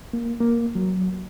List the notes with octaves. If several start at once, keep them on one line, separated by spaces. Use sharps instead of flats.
A#3
A#3
F#3